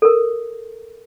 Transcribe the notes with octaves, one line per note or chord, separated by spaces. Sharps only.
A4 A#4